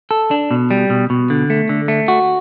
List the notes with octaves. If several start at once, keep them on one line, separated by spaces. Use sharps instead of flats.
A4
D4
B2
G3
B2
B2
D3
A3
D3
A3
F#4